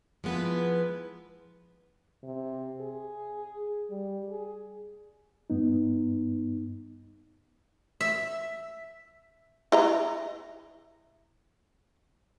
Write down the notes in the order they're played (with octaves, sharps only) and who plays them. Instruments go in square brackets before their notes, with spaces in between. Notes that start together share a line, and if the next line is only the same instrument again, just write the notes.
[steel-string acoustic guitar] F3 G#3 B3 E4 B4
[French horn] C3
G#4
G3
G#4
[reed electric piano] G2 B3 D#4
[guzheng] E5
[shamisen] E4 D#5 A#5